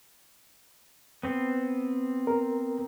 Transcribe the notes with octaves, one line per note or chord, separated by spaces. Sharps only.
B3 C4
A#4